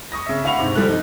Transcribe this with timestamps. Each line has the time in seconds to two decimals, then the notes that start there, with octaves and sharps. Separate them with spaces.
0.12 C#6 D#6 A#6
0.26 C#3 E5
0.44 D2 F5 F#5 B5 C#6 F7
0.59 G#2 C3
0.76 D3 F3 G3 A4 F#6
0.89 D#4